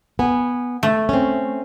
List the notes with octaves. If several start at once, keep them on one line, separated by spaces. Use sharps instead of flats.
B3 G#5
A3
C4 C#4